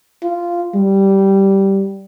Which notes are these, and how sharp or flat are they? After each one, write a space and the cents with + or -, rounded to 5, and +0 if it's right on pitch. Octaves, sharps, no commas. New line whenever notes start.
F4 -10
G3 -10